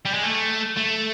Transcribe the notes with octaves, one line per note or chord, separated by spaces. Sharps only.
G3
G#3
A3
A3